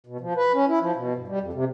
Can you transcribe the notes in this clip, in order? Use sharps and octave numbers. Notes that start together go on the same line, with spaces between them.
B2
F3
B4
C#4
E4
F3
B2
G2
G3
F2
C3